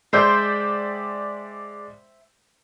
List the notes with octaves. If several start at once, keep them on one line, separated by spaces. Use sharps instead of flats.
G#3 C5 D5 E5 G5 G6